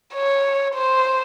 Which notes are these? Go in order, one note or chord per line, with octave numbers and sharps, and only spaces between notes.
C#5
C5